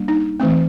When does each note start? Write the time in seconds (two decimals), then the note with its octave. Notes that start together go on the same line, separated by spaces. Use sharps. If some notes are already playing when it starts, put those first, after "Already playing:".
Already playing: G3 A#3 D4
0.08 D#4
0.40 E3 A3 C4